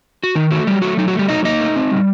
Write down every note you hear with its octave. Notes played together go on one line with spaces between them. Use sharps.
F#4
D#3 D#4
A3 F#4
F#3 G3 G4
A3 F#4
F#3 D#4
F#4
A3
G3 G4
F#3 D#4 D#5
A#3 D#4 D#5
A3
C4
G3